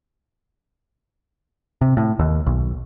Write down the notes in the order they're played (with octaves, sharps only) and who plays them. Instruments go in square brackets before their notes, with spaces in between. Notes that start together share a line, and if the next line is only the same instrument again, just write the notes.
[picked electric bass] C3
A2
D#2
B1